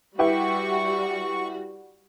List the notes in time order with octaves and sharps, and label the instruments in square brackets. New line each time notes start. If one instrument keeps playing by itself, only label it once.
[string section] G3 F#4 [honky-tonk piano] E4 G4 B4 [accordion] C#6